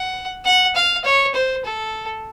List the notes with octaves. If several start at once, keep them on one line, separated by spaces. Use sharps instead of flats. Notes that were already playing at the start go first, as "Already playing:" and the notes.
Already playing: F#5
F#5
F5
C#5
C5
A4